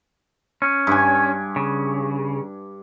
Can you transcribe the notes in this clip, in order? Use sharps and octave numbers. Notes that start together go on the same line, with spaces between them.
C#4
G2 G#5
C#3